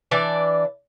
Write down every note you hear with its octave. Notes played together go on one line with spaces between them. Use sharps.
E3 D4 D5